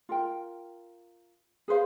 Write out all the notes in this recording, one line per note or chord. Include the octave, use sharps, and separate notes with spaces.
F4 A#4 G5
G#4 B4 C5 F5